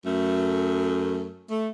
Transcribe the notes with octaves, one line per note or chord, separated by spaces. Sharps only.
F#2 A3
A3